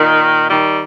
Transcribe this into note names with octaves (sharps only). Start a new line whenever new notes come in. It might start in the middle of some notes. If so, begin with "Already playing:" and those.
Already playing: A#2 D#3
D#3 G3